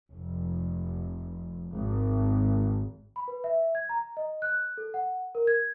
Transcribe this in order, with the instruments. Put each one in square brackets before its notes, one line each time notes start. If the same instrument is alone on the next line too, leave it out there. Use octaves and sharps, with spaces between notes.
[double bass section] F1
G#1
[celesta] B5
B4
E5
G#6
A#5
D#5
F#6
A4
F#5
A#4
G#6